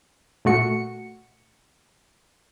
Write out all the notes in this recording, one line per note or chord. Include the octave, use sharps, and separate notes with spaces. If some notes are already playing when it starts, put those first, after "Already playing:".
A#2 A3 F#4 C#7